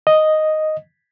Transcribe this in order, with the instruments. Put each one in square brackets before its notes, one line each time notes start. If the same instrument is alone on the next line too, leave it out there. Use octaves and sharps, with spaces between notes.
[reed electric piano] D#5